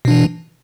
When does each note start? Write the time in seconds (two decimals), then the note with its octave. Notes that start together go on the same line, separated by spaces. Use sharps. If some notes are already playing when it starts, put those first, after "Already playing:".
0.05 B2
0.08 D4
0.11 E3